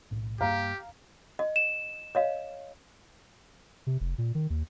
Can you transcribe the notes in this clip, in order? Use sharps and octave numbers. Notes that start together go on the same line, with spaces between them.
B1 A2
G2 G3 A#3 G4 F5 A#5
D#5
E7
C#5 D#5 F5
C3
F1
A#2
D#3
D#2